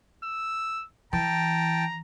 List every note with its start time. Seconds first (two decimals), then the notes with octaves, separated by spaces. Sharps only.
0.24 E6
1.13 E3 G5 A5 A#5